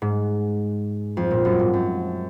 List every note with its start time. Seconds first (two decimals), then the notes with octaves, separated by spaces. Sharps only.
0.02 G#2
1.17 F2
1.31 A#2
1.45 F#2
1.59 G#2
1.74 F#2